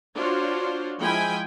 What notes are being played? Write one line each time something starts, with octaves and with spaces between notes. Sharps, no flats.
D4 F4 F#4 C5 C#5
F3 G#3 E4 G5 G#5 B5